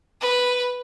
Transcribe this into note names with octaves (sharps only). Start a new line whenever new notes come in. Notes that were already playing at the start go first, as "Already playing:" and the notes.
B4